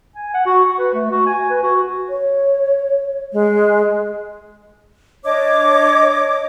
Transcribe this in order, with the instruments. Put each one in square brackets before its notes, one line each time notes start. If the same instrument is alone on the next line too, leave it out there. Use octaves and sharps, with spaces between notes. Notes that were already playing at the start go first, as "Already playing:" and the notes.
[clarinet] G#5
F#5
F#4
C#6
B4
A3
F#4
G#5
B4
F#4
[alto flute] C#5
G#3
[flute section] D4 C#5 D#5 D6